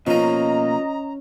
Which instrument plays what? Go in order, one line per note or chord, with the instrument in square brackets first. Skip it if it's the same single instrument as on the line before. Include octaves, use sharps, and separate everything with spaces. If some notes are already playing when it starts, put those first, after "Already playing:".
[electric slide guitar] B2 A#3 [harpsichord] F3 D#4 [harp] C#4 [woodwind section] D#5 A#5